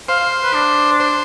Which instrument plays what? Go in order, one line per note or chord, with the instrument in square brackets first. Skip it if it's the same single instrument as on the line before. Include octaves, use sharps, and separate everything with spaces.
[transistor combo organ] C5 [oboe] F5
[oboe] F5
B4
D4
[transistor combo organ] C5